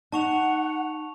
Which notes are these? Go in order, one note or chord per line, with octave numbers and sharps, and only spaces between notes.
D#4 F#5 A5 C#6 F7